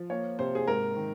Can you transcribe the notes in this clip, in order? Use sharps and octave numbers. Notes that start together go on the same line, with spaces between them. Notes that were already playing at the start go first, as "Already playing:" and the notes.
Already playing: F3
A#3 C#5
C3 C5
G#4
G#2 A#4
D#3